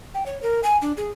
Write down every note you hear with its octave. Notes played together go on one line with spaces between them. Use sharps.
G5
C#5
A#4
G#5
D4
G#4